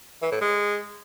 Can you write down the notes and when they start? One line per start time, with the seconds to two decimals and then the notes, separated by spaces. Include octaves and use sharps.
0.22 E3
0.31 A2
0.41 G#3